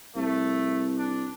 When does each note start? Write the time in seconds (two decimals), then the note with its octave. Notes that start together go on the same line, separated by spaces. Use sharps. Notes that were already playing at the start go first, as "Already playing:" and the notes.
0.16 C2 A3
0.97 D4